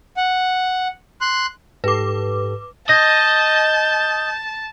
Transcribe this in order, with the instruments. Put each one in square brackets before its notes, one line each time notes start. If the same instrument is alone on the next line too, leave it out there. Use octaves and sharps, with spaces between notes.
[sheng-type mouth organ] F#5
C6 F#6
[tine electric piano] G#2 G4 A4 [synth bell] B4 D6
[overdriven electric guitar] D#5 [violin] A5 [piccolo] G6 [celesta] A#6